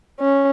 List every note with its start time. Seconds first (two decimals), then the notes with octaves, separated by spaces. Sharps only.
0.20 C#4